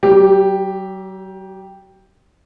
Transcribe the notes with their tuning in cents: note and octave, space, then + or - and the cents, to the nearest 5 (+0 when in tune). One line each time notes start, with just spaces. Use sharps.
F#3 +40 G4 +0